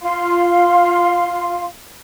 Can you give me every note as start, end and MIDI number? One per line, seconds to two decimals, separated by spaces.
0.02 1.64 65
0.02 1.64 77
0.02 1.64 84